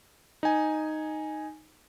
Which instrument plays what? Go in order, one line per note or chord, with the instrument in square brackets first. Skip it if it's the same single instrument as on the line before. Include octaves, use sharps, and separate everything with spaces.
[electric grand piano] D#4 G#5